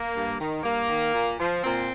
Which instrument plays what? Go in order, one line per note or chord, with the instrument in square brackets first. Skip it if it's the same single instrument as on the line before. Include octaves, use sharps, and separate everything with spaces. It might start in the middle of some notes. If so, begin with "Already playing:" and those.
Already playing: [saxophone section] A#3
G2
D#3
G2 A#3
D#3
A#2
F3
A#2 C4